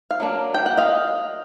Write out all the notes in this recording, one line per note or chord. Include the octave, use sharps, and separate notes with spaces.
F5
F#3 A#3 D4
G5
F#5
D#5 F5